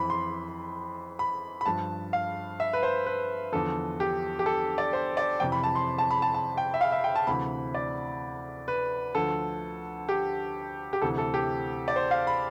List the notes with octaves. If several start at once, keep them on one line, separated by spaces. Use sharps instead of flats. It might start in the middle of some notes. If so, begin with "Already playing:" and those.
Already playing: F2 E3 B5
C6
B5
B5
G2 F3 A5
F5
E5
B4
C5
B4
E2 D3 F3 A4
G4
G4
A4
D5
C5
D5
F2 C3 E3 G5
B5
A5
C6
A5
B5
A5
A5
G5
E5
F5
E5
G5
A5
D2 C3 E3 B5
D5
B4
D2 D3 F3 A4
G4
G4
D2 C3 E3 A4
A4
G4
D5
C5
F5
B5